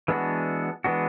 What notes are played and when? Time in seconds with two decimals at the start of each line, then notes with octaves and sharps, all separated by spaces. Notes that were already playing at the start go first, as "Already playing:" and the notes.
0.08 E3 G#3 B3 D4 F#4
0.84 E3 G#3 B3 D4 F#4